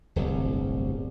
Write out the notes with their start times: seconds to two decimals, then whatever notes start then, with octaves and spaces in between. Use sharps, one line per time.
0.16 D1 G1 C2